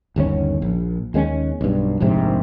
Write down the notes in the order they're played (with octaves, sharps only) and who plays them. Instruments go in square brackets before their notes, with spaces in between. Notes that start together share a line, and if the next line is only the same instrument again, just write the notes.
[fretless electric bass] G1 D#2 B2 C#4
A#1
D#2 G#3 B3 C#4
B1 G2
F1 A#1 G#2 C3